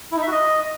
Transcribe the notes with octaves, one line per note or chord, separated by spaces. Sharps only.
E4
D#4
E5
F#4
D#5